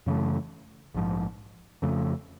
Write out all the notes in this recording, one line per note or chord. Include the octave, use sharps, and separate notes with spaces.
F#2 C#3 E3 A3
A#1 G#2 F3
F2 C#3 F3 A3